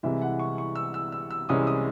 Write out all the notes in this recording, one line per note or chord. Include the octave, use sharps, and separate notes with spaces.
C2 C3 E3 G#3 E5
F#5
C#6
C#6
E6
E6
E6
E6
C2 C3 E3 G#3 C#4 D#6
D#6